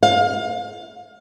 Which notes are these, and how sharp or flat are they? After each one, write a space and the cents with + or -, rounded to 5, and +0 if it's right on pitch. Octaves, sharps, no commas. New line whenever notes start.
F5 +25